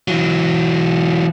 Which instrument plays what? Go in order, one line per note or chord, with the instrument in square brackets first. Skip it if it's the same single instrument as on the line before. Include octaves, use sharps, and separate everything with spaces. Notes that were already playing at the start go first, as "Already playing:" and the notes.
[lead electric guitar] E3 F#3